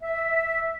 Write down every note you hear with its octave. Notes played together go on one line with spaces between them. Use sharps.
E5